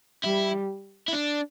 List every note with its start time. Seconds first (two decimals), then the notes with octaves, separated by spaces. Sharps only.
0.24 G3 E4
1.08 E4
1.13 D4